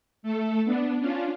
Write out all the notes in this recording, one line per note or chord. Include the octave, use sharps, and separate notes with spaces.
A3 A4
B3 D4
C#4 D4 F4